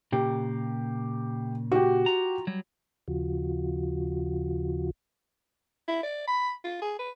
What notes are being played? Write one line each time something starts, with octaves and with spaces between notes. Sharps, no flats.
A#2 C#3 A#3 G4
F#4 G4
F4 A#5
F#3 G3
D#2 C#3 F3 F4 F#4
E4
D5
B5
F4
G#4
B4